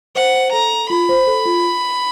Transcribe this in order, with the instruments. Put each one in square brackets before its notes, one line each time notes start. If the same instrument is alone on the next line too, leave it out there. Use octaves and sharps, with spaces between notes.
[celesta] C5 [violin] F#5
[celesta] C5
[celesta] A4 [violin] A#5
[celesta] A4
[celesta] F4 [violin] B5
[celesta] C5
A4
F4